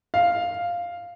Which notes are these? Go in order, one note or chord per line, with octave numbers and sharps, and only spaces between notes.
F5